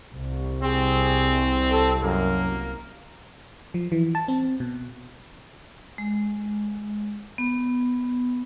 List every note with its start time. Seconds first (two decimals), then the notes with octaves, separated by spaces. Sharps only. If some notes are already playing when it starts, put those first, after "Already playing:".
0.15 C2
0.63 C4 G#4
1.71 A4
2.03 F#2 A#3
3.74 F3
3.92 E3
4.15 A5
4.28 C4
4.60 B2
5.98 G#3
7.38 B3